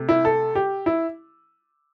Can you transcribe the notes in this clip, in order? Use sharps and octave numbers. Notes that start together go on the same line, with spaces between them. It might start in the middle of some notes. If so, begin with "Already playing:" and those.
Already playing: C3 A3
E4
A4
G4
E4